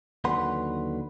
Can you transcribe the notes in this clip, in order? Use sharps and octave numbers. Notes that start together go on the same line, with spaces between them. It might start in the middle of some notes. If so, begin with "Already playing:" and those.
D#2 D3 F#3 B4 F#5 C6